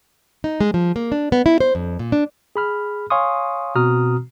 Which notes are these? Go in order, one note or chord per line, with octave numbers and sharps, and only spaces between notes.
D#4
G#3
F3
A#3
D4
B3
E4
C5
F2
A#2
D4
G#4 B5 F6
C#5 F5 G#5 C6 C#6 D#6
B2 C4 F#4 A#5 D#6 F6